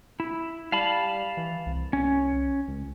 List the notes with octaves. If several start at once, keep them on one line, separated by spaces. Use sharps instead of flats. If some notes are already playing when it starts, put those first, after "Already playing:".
E4
G3 F5 A5 B5
E3
C2
C#4
C#2